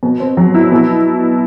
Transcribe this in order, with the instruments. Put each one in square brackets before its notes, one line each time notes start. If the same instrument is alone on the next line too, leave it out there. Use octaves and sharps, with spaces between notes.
[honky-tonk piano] B2
C4
F#3
E4
B2